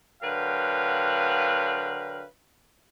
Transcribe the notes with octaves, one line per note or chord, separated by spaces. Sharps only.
D3 F#3 A#4 B4 F5 G5